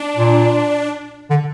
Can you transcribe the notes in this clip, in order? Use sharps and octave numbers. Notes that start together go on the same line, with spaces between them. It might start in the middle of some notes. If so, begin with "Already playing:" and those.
Already playing: D4
A#2
D3